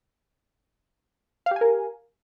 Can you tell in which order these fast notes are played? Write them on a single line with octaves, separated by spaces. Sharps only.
F5 G4 G#5 A#4